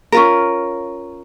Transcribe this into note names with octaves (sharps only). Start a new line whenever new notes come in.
C#4 F4 A#4